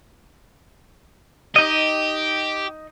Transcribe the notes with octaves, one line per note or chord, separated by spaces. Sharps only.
D#4 G4 D#5